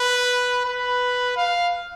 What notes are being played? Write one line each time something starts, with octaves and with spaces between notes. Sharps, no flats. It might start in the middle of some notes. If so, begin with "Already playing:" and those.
Already playing: B4
B4
F5